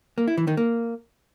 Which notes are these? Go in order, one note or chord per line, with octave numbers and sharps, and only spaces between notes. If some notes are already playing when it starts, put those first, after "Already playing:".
A#3
E4
E3
D#3
A#3